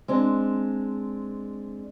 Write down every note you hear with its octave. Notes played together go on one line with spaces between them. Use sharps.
G#3 C4 D4